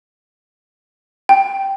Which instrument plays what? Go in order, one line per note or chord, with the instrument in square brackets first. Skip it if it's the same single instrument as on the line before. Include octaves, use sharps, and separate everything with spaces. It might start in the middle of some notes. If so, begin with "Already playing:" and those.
[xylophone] G5